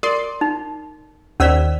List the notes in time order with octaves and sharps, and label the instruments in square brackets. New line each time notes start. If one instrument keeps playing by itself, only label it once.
[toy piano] A#4 [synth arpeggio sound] D5 C6
[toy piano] D#4
[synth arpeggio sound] D#2 E6 B6 [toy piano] C#4 C5 D5